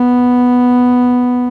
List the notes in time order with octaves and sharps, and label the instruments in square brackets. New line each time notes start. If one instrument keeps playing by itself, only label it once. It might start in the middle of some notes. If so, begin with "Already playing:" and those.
Already playing: [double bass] B3